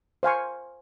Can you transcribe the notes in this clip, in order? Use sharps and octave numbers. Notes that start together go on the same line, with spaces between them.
C5 F5 G#5 C#6